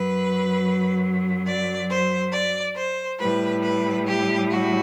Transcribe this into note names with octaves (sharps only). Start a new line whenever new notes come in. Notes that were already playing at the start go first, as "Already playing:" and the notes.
Already playing: F#2 F#3 B4
D5
C5
D5
C5
A2 G3 B4
B4
G4
F#4